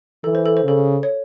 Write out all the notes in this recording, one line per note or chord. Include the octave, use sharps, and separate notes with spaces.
E3 A4
C5
A4
C5
C#3 A4
C#5